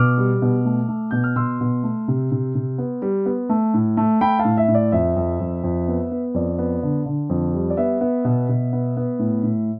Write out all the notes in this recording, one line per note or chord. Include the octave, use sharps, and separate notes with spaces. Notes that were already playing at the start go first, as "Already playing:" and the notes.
Already playing: B2 D6 F6
G3
B2
A3
A3
B2 G6
F6
B2 C6 E6
B2
A3
C3
C3
C3
B3
G3
B3
A3
A2
A3
A3 G5 B5
F5 A5
A2
E5
A2
D5
F2 E5
F2
F2
F2
B3
B3
F2 D5
B3
D3
D3
F2
G3
D5
B3 E5
B3
B2
B2
B3
B3
A2
A2